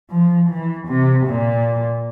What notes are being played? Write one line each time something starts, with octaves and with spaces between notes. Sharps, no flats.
F3
E3
C3
A#2